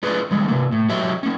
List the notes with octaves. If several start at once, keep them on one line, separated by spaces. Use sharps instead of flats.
D4 F4 G#4 B4 D5
D3 D#3 G3 G#3
C3 A#3
A2
F#3 G4 C#5 D#5 E5
A#3 C#4